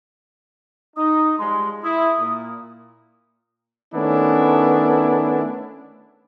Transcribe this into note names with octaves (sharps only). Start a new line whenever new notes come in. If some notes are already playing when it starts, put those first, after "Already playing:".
D#4 D#6
F3 G3 G#3 C6
E4 D#6
A#2
D#3 A3 B3 C#4 D4 E4